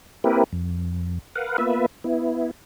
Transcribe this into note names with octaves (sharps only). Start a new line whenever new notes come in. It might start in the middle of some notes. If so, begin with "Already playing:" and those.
A#3 C4 E4 G4 A#4 B4
F2
A#4 B4 F5 F#5
A#3 B3 F4 B4 E5
B3 E4